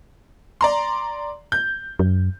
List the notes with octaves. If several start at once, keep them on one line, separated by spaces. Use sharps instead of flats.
D5 A#5 C6
G6
F#2